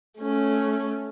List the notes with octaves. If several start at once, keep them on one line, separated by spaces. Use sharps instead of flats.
A3 C#4